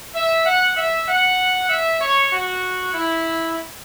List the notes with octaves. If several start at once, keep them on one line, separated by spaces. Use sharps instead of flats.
E5
F#5
E5
F#5
E5
C#5
F#4
E4